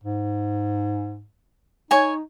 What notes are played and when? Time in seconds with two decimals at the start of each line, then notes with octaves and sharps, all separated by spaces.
0.03 G#2
1.91 D#4 C#5 G#5